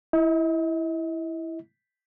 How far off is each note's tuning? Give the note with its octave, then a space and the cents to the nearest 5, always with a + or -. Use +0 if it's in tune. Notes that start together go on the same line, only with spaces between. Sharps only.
E4 +0 D#5 +40